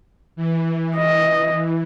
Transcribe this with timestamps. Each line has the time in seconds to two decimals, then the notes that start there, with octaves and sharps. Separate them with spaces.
0.36 E3
0.96 D#5